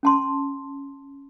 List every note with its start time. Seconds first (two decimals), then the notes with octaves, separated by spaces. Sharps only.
0.03 C#4 A5 C6